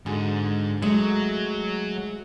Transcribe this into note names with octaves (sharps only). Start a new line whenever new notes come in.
G#2 D3 F#4 G#4
F#3 G#3 A3